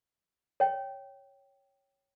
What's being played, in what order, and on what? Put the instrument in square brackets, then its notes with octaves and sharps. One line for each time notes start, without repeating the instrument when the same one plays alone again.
[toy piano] C#5 G5